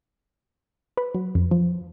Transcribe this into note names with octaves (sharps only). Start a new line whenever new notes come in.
B4
F#3
F2
F3